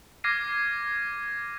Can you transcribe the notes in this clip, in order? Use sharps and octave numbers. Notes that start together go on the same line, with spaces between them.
D6 F6 G#6 A#6 C7 D#7